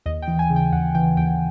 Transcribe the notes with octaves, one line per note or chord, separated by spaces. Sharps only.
D#2 D#5
G5
E3
G#5
C#3
G5
D#2 F#5
E3 G5
D#2 G5